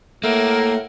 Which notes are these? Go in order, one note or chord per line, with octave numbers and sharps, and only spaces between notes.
A2 A3 A#3 A#4 F#5